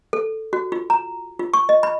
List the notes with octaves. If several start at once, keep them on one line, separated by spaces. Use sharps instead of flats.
A4
F#4
F4
A#5
F4
C#6
D#5
B5